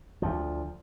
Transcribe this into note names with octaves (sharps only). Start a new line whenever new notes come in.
D2 F3